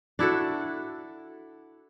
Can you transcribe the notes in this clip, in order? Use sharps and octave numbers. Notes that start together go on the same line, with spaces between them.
D4 E4 F#4 A4